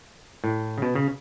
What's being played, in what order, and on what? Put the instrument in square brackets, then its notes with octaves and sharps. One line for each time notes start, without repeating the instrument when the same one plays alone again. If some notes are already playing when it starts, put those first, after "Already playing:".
[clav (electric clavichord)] A2
C#3
B2
C#3